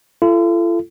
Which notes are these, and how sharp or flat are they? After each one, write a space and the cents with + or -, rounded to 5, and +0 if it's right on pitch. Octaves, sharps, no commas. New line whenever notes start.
F4 -45 A4 +0